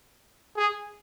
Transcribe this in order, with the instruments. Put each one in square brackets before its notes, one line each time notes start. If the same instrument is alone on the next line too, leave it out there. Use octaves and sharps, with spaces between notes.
[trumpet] G#4